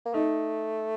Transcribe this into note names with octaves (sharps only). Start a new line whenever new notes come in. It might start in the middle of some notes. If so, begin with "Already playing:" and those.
A#3
A3 D#4